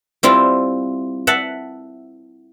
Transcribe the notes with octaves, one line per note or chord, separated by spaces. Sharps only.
G3 C4 E4 F4
E5 F#5 A5